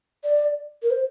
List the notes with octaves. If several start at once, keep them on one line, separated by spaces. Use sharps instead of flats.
D5
A#4
C5